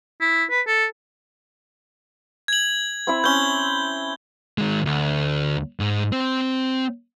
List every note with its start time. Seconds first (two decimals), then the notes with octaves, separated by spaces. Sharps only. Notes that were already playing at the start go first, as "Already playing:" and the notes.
0.21 E4
0.50 B4
0.67 A4
2.48 G#6 F#7
3.07 C4 E4 E5
3.24 C4 C#4 G6 G7
4.58 D#3 G#3
4.85 D2
5.80 G#2
6.12 C4